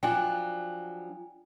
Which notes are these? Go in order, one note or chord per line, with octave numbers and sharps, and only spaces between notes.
F3 F#3 D4 G5 G#5